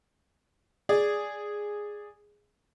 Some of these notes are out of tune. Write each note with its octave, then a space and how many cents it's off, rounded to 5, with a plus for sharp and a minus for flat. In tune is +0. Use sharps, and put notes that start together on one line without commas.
G#4 -5 D5 +0